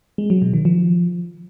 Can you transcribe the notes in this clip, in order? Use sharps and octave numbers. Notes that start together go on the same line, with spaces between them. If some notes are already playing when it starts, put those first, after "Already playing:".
G#3
F#3
B2
D#3
F3